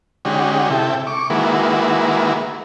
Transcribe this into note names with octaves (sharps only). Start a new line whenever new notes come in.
D3 G#3 C#4 D#4 F#4 G4
C3 E4 A4 G5
C#6 D6
D#3 G#3 A#3 E4 F#4 B4